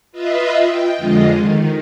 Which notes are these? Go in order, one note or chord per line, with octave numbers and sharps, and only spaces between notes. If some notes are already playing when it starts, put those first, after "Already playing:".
F4 B4 D#5 E5
G5
F2 D3 G#3 F4 D#5
D#3